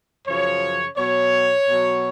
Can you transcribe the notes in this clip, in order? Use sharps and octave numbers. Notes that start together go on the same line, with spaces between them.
F#2 C#3 F3 C#5
B2 F#3 C#5
B2 F#3